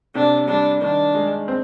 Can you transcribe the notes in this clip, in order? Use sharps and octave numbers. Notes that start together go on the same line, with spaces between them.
C3 D4
G3 D4
D#3 D4
G#3
C4